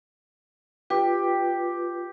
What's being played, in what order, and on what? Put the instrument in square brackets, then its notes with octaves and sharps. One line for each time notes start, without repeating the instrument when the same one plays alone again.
[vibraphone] F4 B4 [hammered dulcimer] G4